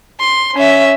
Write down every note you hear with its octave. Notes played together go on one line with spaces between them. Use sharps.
C6
C#4 E5